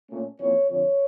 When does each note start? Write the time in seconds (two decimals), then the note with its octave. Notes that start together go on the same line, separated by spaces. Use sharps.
0.10 A#2 A3 C#4
0.39 F2 E3 A#3 C#4 C#5
0.69 F2 D3 F3 C#5